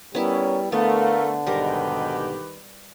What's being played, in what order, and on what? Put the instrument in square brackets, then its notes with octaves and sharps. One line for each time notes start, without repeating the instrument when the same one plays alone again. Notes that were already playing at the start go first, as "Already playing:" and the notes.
[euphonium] G3 [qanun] B3 E4 [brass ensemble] C#4 A#4 C#5
[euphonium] D3 [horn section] A3 [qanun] B3 [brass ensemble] A#4 F5
[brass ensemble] B1 G#2 B2 [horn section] D#3 G4 B4 [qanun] G3 A#4